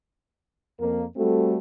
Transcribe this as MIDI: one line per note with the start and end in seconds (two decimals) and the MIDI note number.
0.80 1.03 41
0.80 1.03 58
1.16 1.58 55
1.16 1.58 57
1.16 1.58 60
1.16 1.58 66
1.16 1.58 69